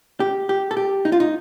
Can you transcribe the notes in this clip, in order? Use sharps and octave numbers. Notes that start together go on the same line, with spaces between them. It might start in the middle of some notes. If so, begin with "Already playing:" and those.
G4
G4
A4
G4
D#4
F4
D#4